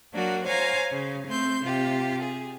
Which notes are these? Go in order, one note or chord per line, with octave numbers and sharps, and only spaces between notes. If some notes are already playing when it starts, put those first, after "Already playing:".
F#3 A#3 D4 F#4 A#4
C5 C#5 F5 G#5 A#5
C#3
A3 C4 C6 G6
C3 F4 G4
G#4